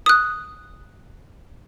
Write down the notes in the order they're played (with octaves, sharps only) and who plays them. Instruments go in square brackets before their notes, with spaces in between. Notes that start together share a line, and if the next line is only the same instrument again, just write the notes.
[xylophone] D#6 F#6